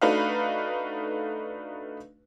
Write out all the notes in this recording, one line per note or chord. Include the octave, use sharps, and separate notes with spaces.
A3 D4 D#4 F#4 B4 F5